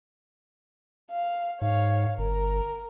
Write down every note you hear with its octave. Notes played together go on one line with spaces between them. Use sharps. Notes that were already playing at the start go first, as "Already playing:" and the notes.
F5
G#2 C#5 F5
G1 A#4